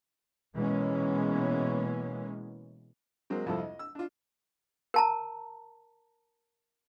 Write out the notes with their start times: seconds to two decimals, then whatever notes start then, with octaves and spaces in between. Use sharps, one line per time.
0.55 B2 E3 G#3 A#3 B3 C#4
3.30 F#3 G#3 A#3 C4
3.46 C2 F2 F3 E4 F4 A4
3.58 D#5
3.79 E6
3.95 D4 F4
4.94 A#4 A5 A#5